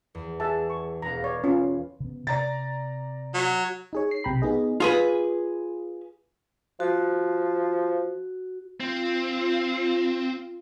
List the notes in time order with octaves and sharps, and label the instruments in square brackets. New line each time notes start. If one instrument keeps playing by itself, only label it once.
[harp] E2
[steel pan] G#4 E5 A5
C#6
[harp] E1 B3 F5 [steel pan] A#5
[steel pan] C#5 D5
C#4 F4
[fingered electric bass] C#3 B3
[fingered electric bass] C3 [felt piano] D5 A#5 A6
[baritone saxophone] F#3
[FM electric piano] D#4 G#4 C#5
C7
B1 C3 G5 A#5 B5
B3 D#4 G#4 D#5
[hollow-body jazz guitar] F4 G#4 B4
[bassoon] F3 [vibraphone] F#4
[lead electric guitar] C4 [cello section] F4